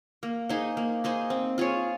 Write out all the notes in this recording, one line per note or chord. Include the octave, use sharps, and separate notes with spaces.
A#3
D#4 G#4 C5
A#3
D#4 G#4 C5
C4
F4 G#4 C#5